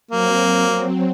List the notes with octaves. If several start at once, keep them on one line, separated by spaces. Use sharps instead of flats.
F#3 A#3 C4